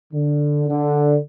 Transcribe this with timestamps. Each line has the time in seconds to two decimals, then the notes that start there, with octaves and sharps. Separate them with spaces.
0.13 D3
0.68 D3